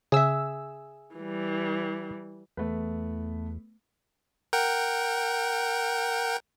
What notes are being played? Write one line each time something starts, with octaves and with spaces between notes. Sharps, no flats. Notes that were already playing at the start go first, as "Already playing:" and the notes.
C#3 G#4 E5 E6
E3 G3
E2 A3 B3 B4
A#4 F#5 G5